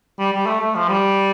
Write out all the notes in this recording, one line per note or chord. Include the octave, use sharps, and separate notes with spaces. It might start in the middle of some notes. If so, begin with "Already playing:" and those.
G3
G3
A3
A3
F3
G3